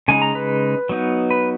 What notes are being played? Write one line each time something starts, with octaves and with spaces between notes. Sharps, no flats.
C#3 G#3 D#4 G#5
A#5
B4
F#3 B3 D#4
B4